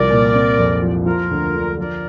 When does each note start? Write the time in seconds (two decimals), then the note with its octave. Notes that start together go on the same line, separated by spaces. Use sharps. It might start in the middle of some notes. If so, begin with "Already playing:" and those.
Already playing: C2 F3 A#4 D5
0.10 A#2
0.34 C4
0.59 F2
0.82 F3
1.06 F3 F4 A#4
1.31 D2
1.55 D3
1.78 F3 A#4 D5